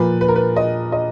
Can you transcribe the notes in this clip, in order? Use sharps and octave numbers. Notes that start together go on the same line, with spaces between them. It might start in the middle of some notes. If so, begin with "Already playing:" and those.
Already playing: A#2 F3 B4
B4
A#4
B4
D#5
D#5